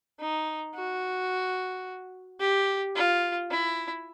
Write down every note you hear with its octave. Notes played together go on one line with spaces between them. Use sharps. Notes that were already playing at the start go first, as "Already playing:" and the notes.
D#4
F#4
G4
F4
E4